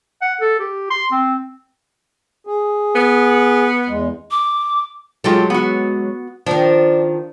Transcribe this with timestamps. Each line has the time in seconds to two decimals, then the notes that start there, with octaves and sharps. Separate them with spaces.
0.21 F#5
0.41 A4
0.60 G4
0.90 C6
1.12 C4
2.47 G#4
2.96 B3
3.88 E2 G#3
4.31 D6
5.24 F#3 G#3 F4 G4 A4
5.50 B3 F#4
6.46 D#3 F3 D4